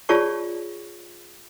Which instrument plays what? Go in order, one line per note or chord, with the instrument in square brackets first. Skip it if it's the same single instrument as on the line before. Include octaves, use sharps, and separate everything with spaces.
[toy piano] F4 G#4 C#5 D5 A5 C#6